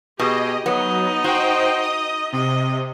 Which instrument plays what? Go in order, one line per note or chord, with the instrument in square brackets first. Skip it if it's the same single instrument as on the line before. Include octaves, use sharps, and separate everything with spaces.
[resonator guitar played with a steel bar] B2 [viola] G4 G#4 [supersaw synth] D#5
[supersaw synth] F#3 [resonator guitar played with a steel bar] B3 [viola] D#4 D#5
[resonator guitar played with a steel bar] F#4 [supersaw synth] C5 G5
[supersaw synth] D#6
[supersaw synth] C3 [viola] D#5